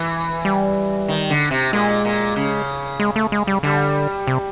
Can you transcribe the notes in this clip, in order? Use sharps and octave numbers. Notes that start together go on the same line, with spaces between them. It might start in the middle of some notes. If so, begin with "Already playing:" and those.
Already playing: E3
G3
D#3
D3
C3
A#2 G#3
A#2
C#3
G#3
A3
G#3
G3
D3 G3
C3